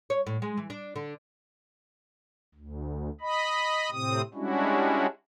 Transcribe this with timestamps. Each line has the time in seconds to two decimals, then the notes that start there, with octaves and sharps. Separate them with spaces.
0.10 C#5
0.27 A2
0.42 G#3
0.57 E3
0.70 D4
0.96 D3
2.55 D2
3.21 D#5 B5
3.91 A2 C3 C4 D#6
4.34 G3 G#3 C#4 D4 E4 F#4